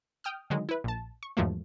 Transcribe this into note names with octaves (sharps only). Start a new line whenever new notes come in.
G5 D#6 F6
D3 D#3 F#3 G#3
E4 B4
A#1 A5
C#6
E2 G#2 F3 F#3 A3 A#3